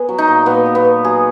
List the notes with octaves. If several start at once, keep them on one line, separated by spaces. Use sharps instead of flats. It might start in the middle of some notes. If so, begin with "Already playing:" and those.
Already playing: B3 G#4
F#3
D#4
A#2
A#2 B3
F#3
B3
F#3
F#3 G#4